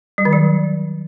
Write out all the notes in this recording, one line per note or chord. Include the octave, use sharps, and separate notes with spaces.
G3
D#3
F#3